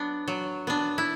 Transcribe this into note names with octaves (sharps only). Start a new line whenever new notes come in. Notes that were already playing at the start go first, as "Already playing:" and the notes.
Already playing: F#3 B3 D4
F#3
B3 D4
E4